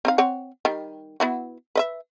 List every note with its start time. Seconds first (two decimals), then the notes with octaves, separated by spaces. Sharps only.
0.05 C4 D#4 F5
0.18 C4 C#5 F#5
0.65 D#3 G3
1.20 B3 E4 F#4
1.75 B4 D#5 E5